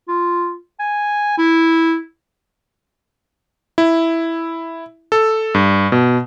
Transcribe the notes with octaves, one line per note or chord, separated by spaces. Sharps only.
F4
G#5
E4
E4
A4
G2
B2